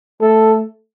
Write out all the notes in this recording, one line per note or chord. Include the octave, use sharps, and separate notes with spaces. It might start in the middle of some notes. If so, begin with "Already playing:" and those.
A3 A4